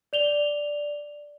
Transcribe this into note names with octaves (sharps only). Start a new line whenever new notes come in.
D5 F7 G7